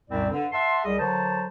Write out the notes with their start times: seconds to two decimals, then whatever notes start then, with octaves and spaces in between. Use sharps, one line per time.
0.10 C2 F#2 A#2 C4 E4 D5
0.31 G2 D3
0.52 E5 F#5 A5 C6
0.85 C2 G3 G#4 D#5
0.98 D3 F#3 A#4 C5 A5